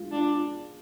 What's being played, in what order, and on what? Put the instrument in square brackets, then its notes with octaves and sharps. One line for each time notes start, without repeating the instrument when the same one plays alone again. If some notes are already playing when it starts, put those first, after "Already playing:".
Already playing: [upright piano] G#3 F4
[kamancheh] D4 [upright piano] F4